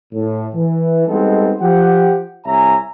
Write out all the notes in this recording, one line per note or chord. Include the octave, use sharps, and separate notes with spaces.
A2
E3
G3 G#3 B3 C4 D#4 A4
F3 G4 F#5
C2 C#5 E5 G#5 A#5